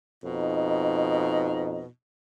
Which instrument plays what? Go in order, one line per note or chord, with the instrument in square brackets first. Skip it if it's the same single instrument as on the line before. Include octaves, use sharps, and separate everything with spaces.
[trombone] F2 [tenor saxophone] B2 [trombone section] D#4